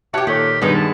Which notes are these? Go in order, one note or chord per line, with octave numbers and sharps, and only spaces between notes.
F#4 G4 C#5 E5 A5 F#6
A#2 D#3 G4 A4 C#5
G2 D#3 G#3 B3 D#4
A5